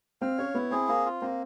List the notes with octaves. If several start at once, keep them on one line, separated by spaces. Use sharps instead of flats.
C4 F5
C#4 C#5
B3 E4
C4 G#4
A#3 C4
F4
A#3 C4